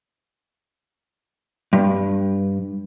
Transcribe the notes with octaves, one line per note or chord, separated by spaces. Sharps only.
G2